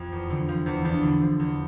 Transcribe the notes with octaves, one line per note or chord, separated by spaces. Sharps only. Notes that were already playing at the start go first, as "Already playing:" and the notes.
Already playing: F2
E2
D3
F3
E2
E2 D4
D3
F3
E2